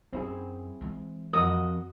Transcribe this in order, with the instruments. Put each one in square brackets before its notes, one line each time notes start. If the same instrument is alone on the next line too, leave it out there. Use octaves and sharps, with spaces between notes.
[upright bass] F#2 [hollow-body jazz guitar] C4 E4 G#4
[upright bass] E3 G#3
[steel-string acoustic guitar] F2 F#4 D#5 [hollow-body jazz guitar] A#4 F#5 [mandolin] D#6